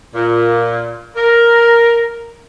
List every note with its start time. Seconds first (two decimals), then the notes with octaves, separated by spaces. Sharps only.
0.15 A#2
1.16 A#4